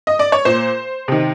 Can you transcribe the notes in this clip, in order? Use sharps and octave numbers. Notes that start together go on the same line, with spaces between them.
D#5
D5
C#5
A#2 C5
C3 D#3